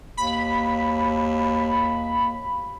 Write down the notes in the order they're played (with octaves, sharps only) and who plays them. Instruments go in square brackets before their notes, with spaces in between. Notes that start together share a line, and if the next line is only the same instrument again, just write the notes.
[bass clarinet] D#2 [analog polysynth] B5